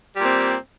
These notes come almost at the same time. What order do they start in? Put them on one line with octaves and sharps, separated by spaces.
G3 A#2 C4